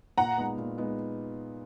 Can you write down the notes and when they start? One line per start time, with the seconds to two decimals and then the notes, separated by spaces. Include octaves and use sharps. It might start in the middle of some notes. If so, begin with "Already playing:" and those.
0.18 A#2 F#5 A#5
0.38 G#3 B3 D#4
0.58 A#2
0.77 G#3 B3 D#4